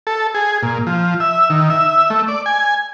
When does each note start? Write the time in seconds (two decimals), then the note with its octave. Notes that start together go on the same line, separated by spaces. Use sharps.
0.07 A4
0.35 G#4
0.63 A#2
0.87 F3
1.20 E5
1.50 D#3
1.70 E5
2.10 A3
2.28 D5
2.46 G#5